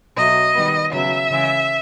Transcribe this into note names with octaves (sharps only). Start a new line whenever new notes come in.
B2 F#3 A3 D#5
D#3 G3 B3
C#3 F#3 B3 E5
C#3 E3 G#3